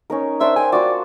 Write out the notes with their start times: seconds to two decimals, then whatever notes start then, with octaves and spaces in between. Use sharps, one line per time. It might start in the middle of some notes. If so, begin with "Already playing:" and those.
0.10 C#4 D#4 A#4
0.40 D4 C5 D5 E5
0.56 G5 G#5
0.72 F4 F#4 D5